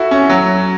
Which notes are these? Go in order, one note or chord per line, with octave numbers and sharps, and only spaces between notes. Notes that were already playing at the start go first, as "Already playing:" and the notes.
Already playing: E4 F#4 A4
C#4
F#3